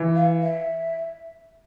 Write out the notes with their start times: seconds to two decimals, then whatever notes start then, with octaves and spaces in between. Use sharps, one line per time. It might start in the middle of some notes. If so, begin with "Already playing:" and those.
Already playing: E3
0.15 F5
0.42 E5